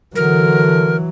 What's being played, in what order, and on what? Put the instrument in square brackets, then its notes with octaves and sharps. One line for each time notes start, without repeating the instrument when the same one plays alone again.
[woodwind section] D3 [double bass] E3 F#3 [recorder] A#4